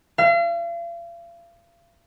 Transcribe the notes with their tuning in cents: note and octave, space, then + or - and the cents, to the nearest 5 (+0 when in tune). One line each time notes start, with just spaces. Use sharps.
F5 -40